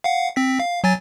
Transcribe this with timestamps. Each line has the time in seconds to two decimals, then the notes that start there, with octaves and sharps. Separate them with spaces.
0.04 F5 F#5
0.36 C4 B6
0.60 F5
0.84 F#3 G#5 A6